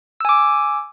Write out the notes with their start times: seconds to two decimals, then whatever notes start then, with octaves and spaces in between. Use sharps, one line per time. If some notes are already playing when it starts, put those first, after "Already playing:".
0.20 E6
0.25 G#5
0.29 D6